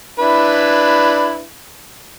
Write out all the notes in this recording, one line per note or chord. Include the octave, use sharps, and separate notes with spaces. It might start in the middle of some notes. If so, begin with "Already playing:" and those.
D4 E4 B4